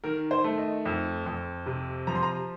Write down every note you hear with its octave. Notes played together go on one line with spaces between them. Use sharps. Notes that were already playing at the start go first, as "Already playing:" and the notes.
D#3 A#4
C5
A3
D#5
F2
F2
C3
F3 A#5
C6
A#5